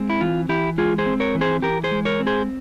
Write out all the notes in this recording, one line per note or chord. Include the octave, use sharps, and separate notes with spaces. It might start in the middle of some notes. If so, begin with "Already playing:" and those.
Already playing: G#3 C4
E4
E3 F4
E3 E4 G4
G#3 F4 G#4
G#4 C5
C4
A#4 C#5
E3
G#4 C5
E3 G4 A#4
G#4 C5
G#3
A#4 C#5
C4
G#4 C5